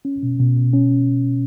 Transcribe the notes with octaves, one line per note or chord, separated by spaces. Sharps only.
C#4
B2
B2
B2
C#4